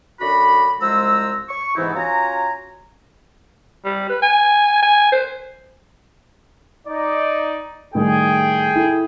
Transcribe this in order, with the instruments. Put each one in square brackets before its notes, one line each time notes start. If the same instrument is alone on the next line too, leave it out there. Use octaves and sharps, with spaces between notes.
[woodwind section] F#2 D3 F#4 D5 B5
C2 F3 G#3 C5 A#5 E6
C#6
G#2 C3 E3 B3 D#4 E4
C#4 F4 F#4 G#5 A#5
[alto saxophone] G3
B4
G#5
G#5
C5
[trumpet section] D#4 D5
[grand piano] A2 D#3 G3 [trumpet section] G#4 G5
[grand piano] E4 A4